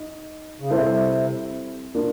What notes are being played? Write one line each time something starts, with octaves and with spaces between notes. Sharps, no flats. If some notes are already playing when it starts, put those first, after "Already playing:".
Already playing: D#4
C#3
C3 G3 C4 E4 A4 C5
A#3 D4 F4